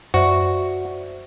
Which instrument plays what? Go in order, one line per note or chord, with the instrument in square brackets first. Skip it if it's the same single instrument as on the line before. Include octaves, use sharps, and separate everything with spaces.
[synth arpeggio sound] F#2 [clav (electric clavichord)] F#4 [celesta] C5 D5 E5